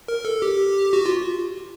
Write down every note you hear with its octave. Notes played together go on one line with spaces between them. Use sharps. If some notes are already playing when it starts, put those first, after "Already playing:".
A#4
A4
G4
F#4
F4